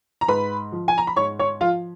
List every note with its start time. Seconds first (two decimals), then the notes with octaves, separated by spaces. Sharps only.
0.21 A#5
0.28 G#2 B4 B5
0.72 F3
0.88 G#5
0.98 A#5
1.07 B5
1.16 G#2 C#5 C#6
1.39 C#5 C#6
1.61 F3 F4 F5